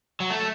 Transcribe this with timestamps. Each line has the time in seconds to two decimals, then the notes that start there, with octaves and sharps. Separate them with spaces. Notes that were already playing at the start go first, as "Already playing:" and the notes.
0.20 F#3
0.30 A3